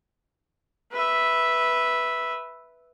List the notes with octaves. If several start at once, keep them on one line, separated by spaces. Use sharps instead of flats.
B4 E5